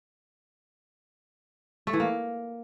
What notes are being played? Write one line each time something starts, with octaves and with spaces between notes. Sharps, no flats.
A3
E3
A#3